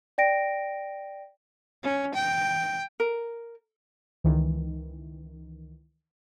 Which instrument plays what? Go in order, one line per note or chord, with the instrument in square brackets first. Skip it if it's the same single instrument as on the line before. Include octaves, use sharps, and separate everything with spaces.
[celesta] D5 G5 A#6 D7
[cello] C#4
G5
[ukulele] A#4
[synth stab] C#2 D#3 E3